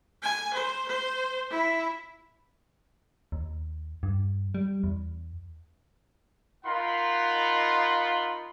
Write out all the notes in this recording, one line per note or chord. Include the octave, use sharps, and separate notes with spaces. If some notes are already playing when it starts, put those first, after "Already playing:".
G#5
C5
C5
E4
D#2
G2
G3
E2
D#4 F4 A#4 F#5 B5 C6